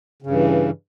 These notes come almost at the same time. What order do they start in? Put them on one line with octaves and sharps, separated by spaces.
C#3 G2 E3